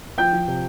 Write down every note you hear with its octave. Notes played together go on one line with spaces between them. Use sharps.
F3 G5 G6
F3
C3